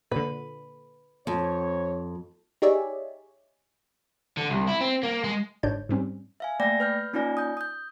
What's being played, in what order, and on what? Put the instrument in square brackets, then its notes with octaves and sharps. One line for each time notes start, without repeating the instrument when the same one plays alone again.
[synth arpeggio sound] A#2 D3 [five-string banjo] B4
[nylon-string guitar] F2 [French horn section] C4 C#5
[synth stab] D#4 G4 G#4 C#5 D5 E5
[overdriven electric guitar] D3
C2
E4
C4
A#3
G#3
[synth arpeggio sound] G1 G#2 D4 C#5 D5 G6
G#2 G3 C4 C#4
[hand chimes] E5 F5 G#5
A3 A#3 D5 G5 A#6
B4 F6 G6
A#3 C#4 D#4 F4 D5 G#5
D#6 G6
D#6 G6